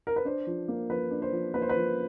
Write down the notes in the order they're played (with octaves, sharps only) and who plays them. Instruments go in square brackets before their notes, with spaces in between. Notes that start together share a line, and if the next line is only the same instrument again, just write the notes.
[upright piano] A#4
B4
D4 C5
F3
A#3
F3 B4
D4
C5
F3
A#3 B4
C5
B4
F3